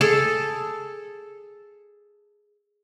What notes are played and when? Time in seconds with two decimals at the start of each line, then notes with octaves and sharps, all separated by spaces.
0.01 G#4 A4